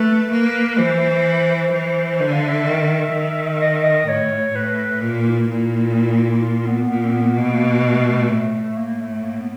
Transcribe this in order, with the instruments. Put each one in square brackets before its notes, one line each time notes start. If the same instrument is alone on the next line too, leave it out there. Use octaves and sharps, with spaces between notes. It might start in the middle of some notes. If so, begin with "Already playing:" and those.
Already playing: [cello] A3 [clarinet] B4
[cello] A#3
[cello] E3 [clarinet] C5
[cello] E3
[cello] D3 [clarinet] C5
[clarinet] F5
E5
[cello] D#3
D#3
[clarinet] D#5
E5
D#5
[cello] A2 [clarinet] C#5
[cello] A2 [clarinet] B4
[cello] A#2
[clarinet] E4
[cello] A#2
[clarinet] F4
B3
[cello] A#2 [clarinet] B3
[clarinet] C4
B3
[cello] B2 [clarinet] A#3
[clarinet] B3
A#3
A#3
A3
A3
[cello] A2
[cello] A2 [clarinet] A#3
[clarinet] A3
A#3
B3